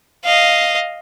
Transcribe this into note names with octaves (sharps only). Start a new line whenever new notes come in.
D#5 F5